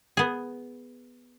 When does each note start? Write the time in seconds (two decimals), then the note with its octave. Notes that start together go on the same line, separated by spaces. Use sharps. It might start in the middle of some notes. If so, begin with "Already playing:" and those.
0.17 B3 G#4